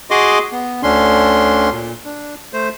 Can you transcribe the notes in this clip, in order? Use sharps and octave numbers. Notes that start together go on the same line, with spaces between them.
F#4 G#4 D#5 C6 D6
B3
D2 D3 C#4 D4 C6
A#2
D4
A3 C5